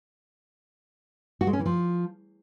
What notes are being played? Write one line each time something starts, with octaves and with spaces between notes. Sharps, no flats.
F#4
G#3
C#4
E3
F3